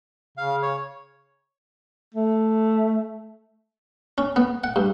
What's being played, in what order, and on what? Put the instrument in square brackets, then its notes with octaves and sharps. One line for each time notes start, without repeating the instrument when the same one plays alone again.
[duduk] C#3 [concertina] F5
[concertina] C#5
[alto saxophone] A3
[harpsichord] C#4
B3
F#5
G2